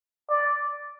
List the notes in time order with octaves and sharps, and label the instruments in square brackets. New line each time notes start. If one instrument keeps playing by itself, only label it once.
[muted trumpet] D5